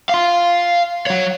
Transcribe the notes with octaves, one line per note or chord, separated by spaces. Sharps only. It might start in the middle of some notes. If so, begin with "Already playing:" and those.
F5 C6
F#3 C#5